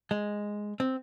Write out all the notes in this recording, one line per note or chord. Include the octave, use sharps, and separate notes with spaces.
G#3
C4